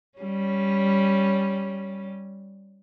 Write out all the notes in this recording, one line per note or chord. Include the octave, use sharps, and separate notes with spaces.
G3 C#4